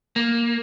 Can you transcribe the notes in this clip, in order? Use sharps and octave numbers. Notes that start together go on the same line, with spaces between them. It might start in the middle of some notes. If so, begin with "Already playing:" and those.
A#3